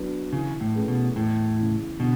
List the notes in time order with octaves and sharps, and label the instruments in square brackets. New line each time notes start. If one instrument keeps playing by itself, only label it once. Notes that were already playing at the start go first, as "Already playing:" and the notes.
Already playing: [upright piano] F#3 B3 D4
[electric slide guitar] C#3 [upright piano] E3
[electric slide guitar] A2
[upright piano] A3 C#4 G#4 B4
[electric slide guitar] B2
[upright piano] E2 [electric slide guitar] A2
[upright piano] C#3 E3
[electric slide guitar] B2 [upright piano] D3